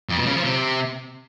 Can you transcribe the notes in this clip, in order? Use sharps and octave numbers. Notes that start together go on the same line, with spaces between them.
F2
B2
C#3
F3
C3